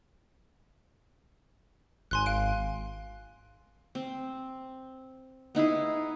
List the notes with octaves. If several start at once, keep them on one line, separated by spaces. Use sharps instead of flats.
G#1 G#5 C6 F#6
F5 D7
C4
B3 D#4 E4 G#4